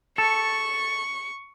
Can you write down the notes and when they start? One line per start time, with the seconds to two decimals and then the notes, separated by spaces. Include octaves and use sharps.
0.18 A4 C#6